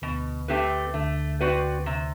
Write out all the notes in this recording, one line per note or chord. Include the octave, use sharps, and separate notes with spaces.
D2 B2 D3
A3 C4 G4 B4
D2 D3 A3
C4 F#4 B4 D5
C3